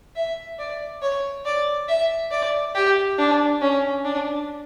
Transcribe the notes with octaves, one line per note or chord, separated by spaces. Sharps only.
E5
D5
C#5
D5
E5
D5
G4
D4
C#4
D4